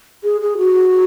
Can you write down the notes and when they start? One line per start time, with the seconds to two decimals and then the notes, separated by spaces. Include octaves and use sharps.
0.23 G#4
0.41 G#4
0.58 F#4